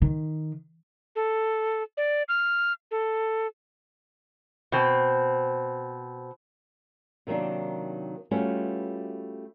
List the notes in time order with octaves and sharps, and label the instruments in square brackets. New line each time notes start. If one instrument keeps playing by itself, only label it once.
[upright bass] D#3
[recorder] A4
D5
F6
A4
[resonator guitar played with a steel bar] B2 C4
[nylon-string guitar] C3 D#3 F#3 A#3 D4
G3 A3 C#4 F4 F#4 B4